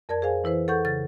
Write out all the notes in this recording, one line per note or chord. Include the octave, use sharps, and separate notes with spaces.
F2 A#4 D5 A5 G#6
G#4 C5 F5 G#5
E3 E4 B4 C5
A4 F#5 C#6 G6
C#3 A6